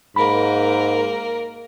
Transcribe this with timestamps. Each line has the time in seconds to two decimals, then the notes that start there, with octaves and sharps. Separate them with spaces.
0.16 G#2 A#3 A#4 B5